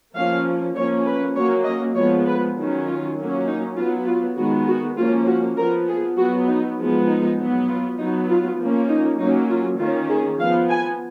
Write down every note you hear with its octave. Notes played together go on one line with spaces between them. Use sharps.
F3 A#3 C#4 F5
F3 A#3 C#4 C#5
B4
F#3 A#3 C#4 C#5
D#5
F3 G#3 B3 C#5
B4
D#3 F#3 C#4
F4
F#3 A#3 C#4
D#4
F#3 B3 F4
F4
D#3 G#3 B3 F#4
F#4
F3 A#3 C#4 F4
F#4
F3 B3 A#4
G#4
F#3 B3 F#4
D#4
F3 G#3 B3
D#4
F#3 B3
F4
F#3 B3 D#4
F4
F3 A#3 C#4
D#4
F#3 A#3 C#4 D#4
F4
D#3 A#3 C#4 F4
G#4
F3 B3 F5
G#5